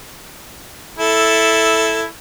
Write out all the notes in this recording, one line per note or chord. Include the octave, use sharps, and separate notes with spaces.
E4 A4